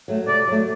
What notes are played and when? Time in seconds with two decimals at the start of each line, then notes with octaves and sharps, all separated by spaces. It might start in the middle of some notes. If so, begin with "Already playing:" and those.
0.08 F#3 A3
0.27 C3 D5
0.48 F#3 A3